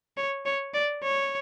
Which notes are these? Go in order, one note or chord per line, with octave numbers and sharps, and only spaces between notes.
C#5
C#5
D5
C#5